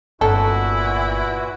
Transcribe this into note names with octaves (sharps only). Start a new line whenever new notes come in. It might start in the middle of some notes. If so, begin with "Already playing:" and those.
G1 A#2 E3 C#4 D#4 E4 F#4 A4